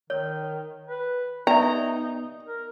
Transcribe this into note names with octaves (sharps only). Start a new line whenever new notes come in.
D#3 C#5
B4
B3 D#4 G4 D5 E5 A#5
A#4